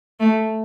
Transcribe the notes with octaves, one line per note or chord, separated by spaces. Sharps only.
A3